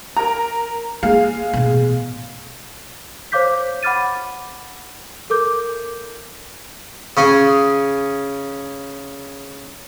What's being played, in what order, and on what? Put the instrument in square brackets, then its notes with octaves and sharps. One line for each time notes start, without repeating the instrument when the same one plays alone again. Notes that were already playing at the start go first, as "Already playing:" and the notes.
[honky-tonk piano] A#4 A#5
[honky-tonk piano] G#3 F5 [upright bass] A#3
[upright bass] A1 B2
[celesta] C5 C#5 F5 D6 G6 B6
F#5 B5 D6 F6 A6 D#7
A4 A#4 D6 G6
[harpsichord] C#3 C#4 G#4